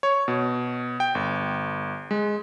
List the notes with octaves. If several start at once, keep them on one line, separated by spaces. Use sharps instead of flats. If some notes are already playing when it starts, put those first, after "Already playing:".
C#5
B2
G5
G1
G#3